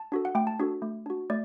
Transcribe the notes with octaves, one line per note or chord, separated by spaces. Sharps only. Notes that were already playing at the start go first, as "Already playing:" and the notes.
Already playing: A5
D4 F#4 A4
F#5
A3 G5
A5
D4 F#4 A4
A3
D4 F#4
A3 D5